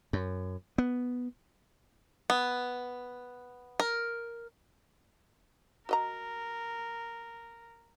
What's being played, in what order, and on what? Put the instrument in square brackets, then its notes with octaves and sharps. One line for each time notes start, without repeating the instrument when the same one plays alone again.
[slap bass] F#2
B3
[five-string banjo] B3
A#4
[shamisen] F#4 D#5 A#5 [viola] A#4